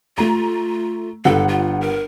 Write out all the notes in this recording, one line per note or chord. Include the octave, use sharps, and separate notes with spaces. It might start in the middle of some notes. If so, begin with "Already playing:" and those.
A3 F4 A#5
G1 A4 F#5
F4
A#4